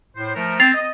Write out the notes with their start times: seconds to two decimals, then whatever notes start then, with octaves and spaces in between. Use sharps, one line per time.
0.16 A2 C5
0.35 F3 A3 A#4
0.60 C4 A6 C7 F7
0.74 D#5